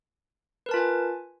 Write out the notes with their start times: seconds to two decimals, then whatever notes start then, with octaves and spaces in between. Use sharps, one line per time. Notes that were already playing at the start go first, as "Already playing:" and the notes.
0.66 B4
0.69 A#4
0.71 A5
0.74 F4
0.76 G#5